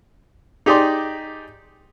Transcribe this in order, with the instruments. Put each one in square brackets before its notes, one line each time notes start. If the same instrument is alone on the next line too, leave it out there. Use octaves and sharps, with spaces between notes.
[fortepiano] D#4 G4 G#4 D5 C6